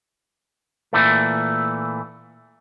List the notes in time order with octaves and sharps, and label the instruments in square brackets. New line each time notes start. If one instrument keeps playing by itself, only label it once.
[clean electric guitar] A#2 E3 A3